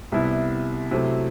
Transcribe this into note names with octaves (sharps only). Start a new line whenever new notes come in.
C2 C3 G3 B3 E4
C3 F#3 A3 C4 E4